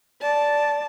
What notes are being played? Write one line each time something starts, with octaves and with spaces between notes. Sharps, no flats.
D5 A5